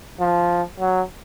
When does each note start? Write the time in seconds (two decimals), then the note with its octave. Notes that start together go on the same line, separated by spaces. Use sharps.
0.20 F3
0.80 F#3